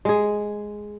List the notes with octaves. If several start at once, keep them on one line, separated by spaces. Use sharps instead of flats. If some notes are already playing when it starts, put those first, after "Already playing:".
G#3 G#4